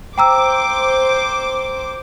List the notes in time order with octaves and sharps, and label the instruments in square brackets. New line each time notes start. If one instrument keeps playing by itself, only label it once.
[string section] C5 D6 [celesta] G5 A#5 E6